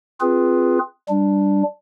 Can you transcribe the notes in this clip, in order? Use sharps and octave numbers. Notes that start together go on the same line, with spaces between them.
C4 F4 G#4 B4
G3 D4